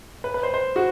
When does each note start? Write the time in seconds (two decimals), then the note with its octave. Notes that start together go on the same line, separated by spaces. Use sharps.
0.24 B4
0.34 B4
0.43 C5
0.54 C5
0.76 F#4